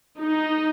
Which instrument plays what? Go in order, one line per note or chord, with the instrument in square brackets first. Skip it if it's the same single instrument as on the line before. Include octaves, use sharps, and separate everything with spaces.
[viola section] D#4